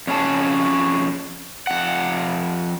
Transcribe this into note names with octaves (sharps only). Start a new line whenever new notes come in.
F2 C#4 G#4 A5
F2 F#5